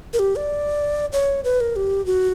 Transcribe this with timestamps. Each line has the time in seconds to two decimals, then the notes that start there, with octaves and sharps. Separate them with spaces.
0.14 A#4
0.19 G4
0.36 D5
1.13 C#5
1.44 B4
1.60 A#4
1.76 G4
2.06 F#4